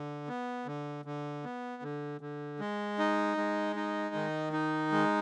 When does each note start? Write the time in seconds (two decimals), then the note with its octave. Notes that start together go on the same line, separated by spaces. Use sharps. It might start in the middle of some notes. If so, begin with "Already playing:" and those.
Already playing: D3
0.28 B3
0.66 D3
1.05 D3
1.44 B3
1.82 D3
2.21 D3
2.60 G#3
2.99 D#4
3.37 G#3
3.76 D#4
4.15 D#3
4.53 D#4
4.92 G#3